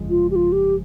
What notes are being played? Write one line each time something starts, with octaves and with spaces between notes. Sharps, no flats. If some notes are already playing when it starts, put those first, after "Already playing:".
Already playing: G1 F2 C#3 F3 G#3
F4
G4
F4
G4